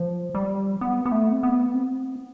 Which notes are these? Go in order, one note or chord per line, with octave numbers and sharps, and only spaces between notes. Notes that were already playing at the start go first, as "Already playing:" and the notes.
Already playing: F3
G3
B3
B3
A3
C4
B3
C4